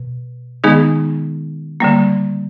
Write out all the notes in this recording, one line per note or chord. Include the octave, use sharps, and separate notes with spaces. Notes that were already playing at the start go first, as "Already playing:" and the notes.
Already playing: B2
D#3 G#3 B3 D#4 G#4
D3 G3 A#3